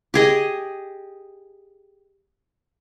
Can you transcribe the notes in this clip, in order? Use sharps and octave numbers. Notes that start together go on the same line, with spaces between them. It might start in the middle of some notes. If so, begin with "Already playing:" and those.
G4 G#4 D#5